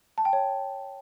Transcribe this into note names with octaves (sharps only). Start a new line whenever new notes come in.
A5
G5
C#5